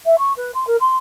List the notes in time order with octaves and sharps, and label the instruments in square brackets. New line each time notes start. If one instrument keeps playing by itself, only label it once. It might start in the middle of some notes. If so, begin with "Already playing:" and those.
[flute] E5
C#6
B4
C6
A#4
C6